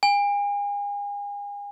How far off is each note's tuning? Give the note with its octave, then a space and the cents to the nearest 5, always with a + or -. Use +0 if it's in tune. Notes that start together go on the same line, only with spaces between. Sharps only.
G#5 -40